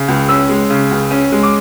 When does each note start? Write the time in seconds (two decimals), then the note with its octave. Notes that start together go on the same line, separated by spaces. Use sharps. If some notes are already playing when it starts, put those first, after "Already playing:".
Already playing: C#3
0.08 C#2
0.29 C#4 E6
0.49 G#3
0.70 C#3
0.91 C#2
1.11 C#4
1.32 G#3
1.43 D6